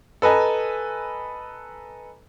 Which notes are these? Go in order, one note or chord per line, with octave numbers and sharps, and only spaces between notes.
A4 B4 D#5 G#5 A#5